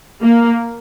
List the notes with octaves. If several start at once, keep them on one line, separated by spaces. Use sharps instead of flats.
A#3